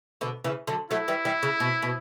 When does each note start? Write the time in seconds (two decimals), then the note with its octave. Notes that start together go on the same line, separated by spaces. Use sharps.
0.21 B2 D3
0.44 C#3 E3
0.67 D3 F#3
0.91 F#3 A3 E4
1.08 E3 G3
1.25 E3 G3
1.43 C#3
1.60 B2
1.82 B2